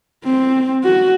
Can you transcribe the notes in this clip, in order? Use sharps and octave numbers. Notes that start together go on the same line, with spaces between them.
C4
F#4